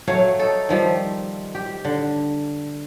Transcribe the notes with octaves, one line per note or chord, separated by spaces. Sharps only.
F#3 A3 C#5 F5
D#4 A4
D#3 F3 G3
G4
D3